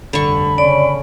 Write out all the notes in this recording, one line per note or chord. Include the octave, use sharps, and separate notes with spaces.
F1 G2 D3 B5 C#6
C#3 C#4 D5